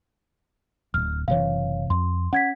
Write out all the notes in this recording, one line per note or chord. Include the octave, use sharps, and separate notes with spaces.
D1 F6
F#1 C3 E3 C#5 F5
F2 C6
C#4 F#5 G#6 B6